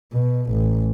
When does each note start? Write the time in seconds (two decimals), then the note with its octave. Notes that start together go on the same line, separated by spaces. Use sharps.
0.13 B2
0.51 A1